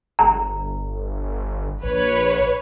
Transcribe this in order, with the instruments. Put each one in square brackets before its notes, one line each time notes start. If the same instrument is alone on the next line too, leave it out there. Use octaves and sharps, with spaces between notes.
[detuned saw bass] G1 [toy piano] A#5
[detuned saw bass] A#1 [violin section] B4 C#5